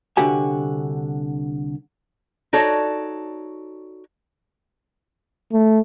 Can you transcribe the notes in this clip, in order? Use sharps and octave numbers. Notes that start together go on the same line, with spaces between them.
C2 D3 F#4 G4 G#5
D#4 F#4 A4 C#5 D5
A3